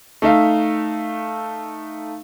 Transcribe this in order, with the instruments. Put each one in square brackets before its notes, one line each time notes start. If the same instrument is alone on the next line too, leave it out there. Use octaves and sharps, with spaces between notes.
[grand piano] A3 D#4 E5 F5